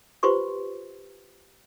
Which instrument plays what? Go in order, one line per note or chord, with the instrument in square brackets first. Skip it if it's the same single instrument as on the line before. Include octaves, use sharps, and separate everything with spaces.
[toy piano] F4 G4 B4 C5 C6 C#6